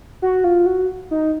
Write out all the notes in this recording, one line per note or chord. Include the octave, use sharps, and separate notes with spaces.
F#4
F4
F#4
D#4